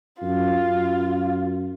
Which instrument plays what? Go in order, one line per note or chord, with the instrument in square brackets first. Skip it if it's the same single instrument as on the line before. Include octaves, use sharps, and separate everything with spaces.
[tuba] F#2 [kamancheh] F4
[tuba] F#2